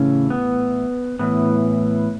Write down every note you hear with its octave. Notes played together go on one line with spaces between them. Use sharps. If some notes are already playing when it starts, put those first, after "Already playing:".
Already playing: A2 C#3 E3 C#4
B3
A2 E3 B3